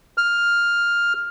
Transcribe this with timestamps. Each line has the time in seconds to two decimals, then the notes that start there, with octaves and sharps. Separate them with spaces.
0.17 F6